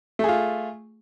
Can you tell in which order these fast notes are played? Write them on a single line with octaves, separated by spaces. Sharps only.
A3 G#4 F4